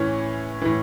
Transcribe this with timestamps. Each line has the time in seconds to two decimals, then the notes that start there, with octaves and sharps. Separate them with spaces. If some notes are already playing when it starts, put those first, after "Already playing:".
Already playing: A2 E3 C#4
0.62 A2 E3